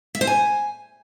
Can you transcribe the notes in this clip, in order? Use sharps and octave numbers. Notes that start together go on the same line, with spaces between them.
E5
C5
G#5